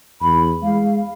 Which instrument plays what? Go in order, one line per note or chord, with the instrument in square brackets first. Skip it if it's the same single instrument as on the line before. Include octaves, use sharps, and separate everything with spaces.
[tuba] E2 [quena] B5
[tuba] G#3 [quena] F5